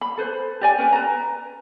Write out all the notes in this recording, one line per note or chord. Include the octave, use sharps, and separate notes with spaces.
B5
A4 B4 C5
G4 D5 G#5
C#4 B4 G5
B4 A#5